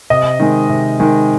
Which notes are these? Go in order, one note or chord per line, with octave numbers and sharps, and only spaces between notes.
C3 D#5
D#3 G#3
C3
D#3 G#3